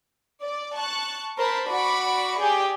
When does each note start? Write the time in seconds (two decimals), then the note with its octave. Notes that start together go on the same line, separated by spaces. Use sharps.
0.41 D5
0.75 A5 C#6 F#6
1.37 A#4 C5 A5 B5
1.69 F#4 D5 B5 C#6 D7
2.39 G4 G#4 D5